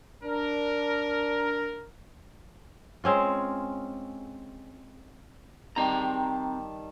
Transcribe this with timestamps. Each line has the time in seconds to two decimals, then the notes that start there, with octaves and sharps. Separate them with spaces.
0.23 D4 A#4
3.04 G#3 C4 C#4 F4
5.76 D#3 G3 C4 A5 A#5